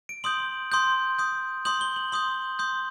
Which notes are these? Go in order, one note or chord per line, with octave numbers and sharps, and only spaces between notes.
D7
C6 D#6 G6 F#7
C6 D#6 G6
C6 D#6 G6
C6 D#6 G6 F#7
G7
F#7
C6 D#6 G6 F#7
C6 D#6 G6